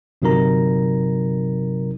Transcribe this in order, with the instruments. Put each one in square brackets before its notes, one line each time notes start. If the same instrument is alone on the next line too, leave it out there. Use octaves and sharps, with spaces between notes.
[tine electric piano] G1 C3 F#3 D#4 A#4 A#5